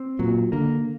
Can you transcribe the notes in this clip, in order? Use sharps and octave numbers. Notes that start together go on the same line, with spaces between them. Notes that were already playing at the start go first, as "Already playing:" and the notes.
Already playing: C4
A#2 F#3
D3 A#3